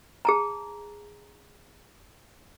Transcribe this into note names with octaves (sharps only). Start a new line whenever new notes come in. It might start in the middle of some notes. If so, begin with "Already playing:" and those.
G#4 A5 A#5